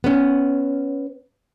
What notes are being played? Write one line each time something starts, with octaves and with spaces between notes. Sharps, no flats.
B3 C#4